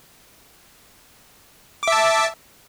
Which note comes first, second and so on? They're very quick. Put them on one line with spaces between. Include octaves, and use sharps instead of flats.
D6 E5 A5